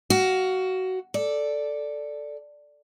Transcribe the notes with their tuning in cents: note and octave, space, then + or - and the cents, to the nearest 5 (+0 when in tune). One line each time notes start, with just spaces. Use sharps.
F#4 +15 F5 +0
A4 +0 D5 +0